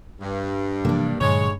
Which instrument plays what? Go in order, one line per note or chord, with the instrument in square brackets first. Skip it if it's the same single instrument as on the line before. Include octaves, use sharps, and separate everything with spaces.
[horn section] G2
[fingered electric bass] C3 E3 F3 [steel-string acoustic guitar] A#3 D4
[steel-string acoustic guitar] G2 [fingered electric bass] A#2 D3 F#3 [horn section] G#3 C#5